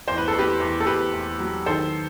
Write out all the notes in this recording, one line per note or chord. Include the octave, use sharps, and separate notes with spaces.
E2 C5
B4
A4
E2
G4 B4
E2
A4
E2 G4 B4
E2
F#3
D#3 A4 C5